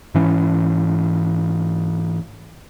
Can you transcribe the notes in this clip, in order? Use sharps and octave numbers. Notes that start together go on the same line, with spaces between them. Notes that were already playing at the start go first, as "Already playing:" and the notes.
G#2 E3 C#4